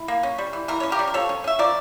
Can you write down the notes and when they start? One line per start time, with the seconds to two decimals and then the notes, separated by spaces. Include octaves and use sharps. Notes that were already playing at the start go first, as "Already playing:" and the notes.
Already playing: E4
0.08 A#3
0.23 C#4
0.38 G3
0.53 E3
0.68 E3 A#4
0.80 C#4 C#5
0.92 G4 A#4
0.99 G3
1.08 A#4
1.14 F3 A4 C#5
1.29 C#4
1.44 C#4 E5
1.59 F3 A#4 D5